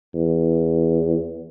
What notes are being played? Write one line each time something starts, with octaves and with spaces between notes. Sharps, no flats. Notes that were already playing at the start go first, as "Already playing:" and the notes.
E2